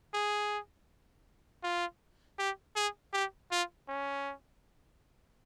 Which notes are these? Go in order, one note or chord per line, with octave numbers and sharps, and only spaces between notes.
G#4
F4
G4
G#4
G4
F4
C#4